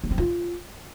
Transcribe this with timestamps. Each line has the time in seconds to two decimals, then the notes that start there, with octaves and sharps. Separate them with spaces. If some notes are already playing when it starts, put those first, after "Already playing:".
0.04 B3
0.11 C4
0.18 F4